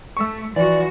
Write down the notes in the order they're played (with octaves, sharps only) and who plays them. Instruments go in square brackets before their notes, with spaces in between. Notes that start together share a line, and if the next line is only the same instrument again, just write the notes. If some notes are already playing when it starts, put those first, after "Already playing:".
[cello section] A3 [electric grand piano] C#6 E6
[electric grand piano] E3 [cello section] F3 F#4 [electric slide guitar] D5